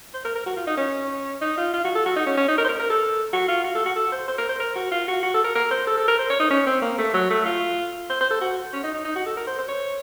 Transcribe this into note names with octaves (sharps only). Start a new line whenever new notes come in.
C5
A#4
A#4
F#4
F4
D#4
C#4
D#4
F4
F4
F#4
A4
F#4
D#4
C#4
C#4
D#4
A#4
C5
A#4
A#4
A4
F#4
F4
F#4
A4
F#4
A4
C5
C5
A#4
C5
A#4
F#4
F4
F#4
F#4
A4
A#4
A#4
C5
A4
A4
A#4
C5
C#5
D#4
C#4
C4
A#3
A3
F#3
A3
F4
C5
C5
A4
F#4
C#4
D#4
D#4
D#4
F#4
A4
A#4
C5
C5
C#5